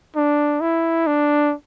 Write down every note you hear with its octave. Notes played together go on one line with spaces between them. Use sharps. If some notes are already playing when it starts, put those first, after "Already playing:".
D4
E4
D4